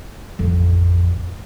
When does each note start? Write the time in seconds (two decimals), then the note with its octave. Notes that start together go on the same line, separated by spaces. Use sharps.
0.39 A1 F2